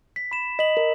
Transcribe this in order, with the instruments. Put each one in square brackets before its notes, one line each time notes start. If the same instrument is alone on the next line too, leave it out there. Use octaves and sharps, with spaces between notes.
[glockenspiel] B6
B5 E7
[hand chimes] D#5 [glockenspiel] B6 F#7
[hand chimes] A#4